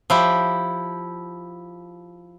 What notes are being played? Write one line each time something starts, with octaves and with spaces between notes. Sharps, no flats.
F3 E4 G4